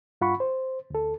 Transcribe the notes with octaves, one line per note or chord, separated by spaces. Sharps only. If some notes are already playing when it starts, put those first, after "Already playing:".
G2 F4 F#5 B5 C#6
C5
D2 A4